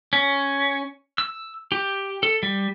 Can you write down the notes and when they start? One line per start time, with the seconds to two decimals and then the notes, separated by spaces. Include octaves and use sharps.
0.13 C#4
1.18 E6
1.72 G4
2.23 A4
2.43 G3